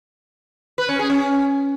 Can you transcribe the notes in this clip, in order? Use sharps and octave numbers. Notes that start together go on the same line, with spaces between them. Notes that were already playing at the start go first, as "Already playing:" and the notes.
B4
C#4
G#4
C#4